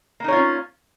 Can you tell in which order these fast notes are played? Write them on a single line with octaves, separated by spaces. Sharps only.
A#3 D#4 C#5 F4 C#4